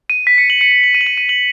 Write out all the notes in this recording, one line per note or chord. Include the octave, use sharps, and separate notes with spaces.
D#7
B6
C#7
F#7
C#7
C#7
F#7
D#7
F#7
D#7
D#7
F#7